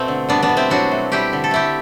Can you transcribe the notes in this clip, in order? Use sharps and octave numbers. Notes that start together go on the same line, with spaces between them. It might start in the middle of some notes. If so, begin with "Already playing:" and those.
Already playing: B2 A3 C4
D3
G3 B3 D4
B3 D4
B2
C4 E4
F#3 D4 F#4
A3
G3 E4 G4
D3
A4
A3 E4 G4